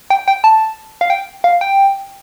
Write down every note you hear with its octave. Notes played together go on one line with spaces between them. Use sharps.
G5
G5
A5
F5
G5
F5
G5